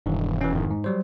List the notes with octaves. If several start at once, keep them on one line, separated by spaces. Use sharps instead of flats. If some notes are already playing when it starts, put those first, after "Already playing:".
E1 G2 D#3 E3
E3 C#4
F2 G#2 D#3
G#2
F#3 G3 C5